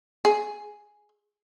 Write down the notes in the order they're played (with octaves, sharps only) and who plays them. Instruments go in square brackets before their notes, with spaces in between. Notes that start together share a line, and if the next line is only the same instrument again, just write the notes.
[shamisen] G#4